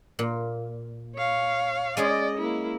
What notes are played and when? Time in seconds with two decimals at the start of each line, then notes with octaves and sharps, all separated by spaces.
0.19 A#2
1.16 C#5 F5
1.97 G#3 C#4 G#4 D5 D#5
2.38 A#3 E4